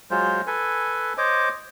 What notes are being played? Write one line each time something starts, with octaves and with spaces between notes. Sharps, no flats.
F#3 G#3 F4 C5
A4 B4 G#5
C5 C#5 D#5 D6